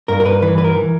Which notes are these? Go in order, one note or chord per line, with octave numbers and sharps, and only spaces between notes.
G2 A#4
A#4
B4
E3 B4
B4
A#4
E3